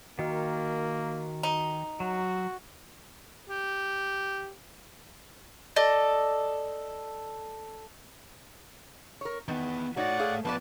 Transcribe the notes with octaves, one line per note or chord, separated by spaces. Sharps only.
D#3 A#3 F#4 D#5 F6
D#4
F#3 F#4
G4
A4 D5 D#5
A#4 C#5
E2 D#3 B3
A3 D#4 F#4 C#5 D5 F#5
G#4 F5
A#2 F3 B3 B4 C5 D5 A5